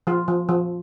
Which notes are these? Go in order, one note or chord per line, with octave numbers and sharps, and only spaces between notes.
F3 F4
F3
F3